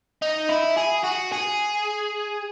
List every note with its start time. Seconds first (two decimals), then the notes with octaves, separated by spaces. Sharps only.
0.22 D#4
0.49 E4
0.78 G#4
1.04 F#4
1.32 G#4